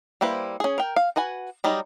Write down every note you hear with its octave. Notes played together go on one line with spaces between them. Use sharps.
G3 A#3 E4 B4 C5
C#4 G#4
A#4 G5
F5
F#4 B4 F#5 G#5
F#3 G3 D#4